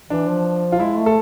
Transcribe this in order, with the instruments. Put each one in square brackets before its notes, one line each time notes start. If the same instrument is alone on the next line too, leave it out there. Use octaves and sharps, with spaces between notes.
[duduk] E3 [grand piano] D4
[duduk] F3
[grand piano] F4
[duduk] G#3 [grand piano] E4
[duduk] A3
[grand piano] A4